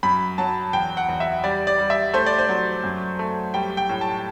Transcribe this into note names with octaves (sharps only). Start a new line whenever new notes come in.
F#2 B5
F#3 A5
E2 G5
F#5
E2
E5
G3 D5
D5
G3
E5
A3 C5
D5
C5
F#3
F#2
A3
G3 G5
G5
A2
A5